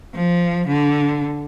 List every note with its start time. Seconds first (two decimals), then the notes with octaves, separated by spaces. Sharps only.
0.14 F3
0.67 D3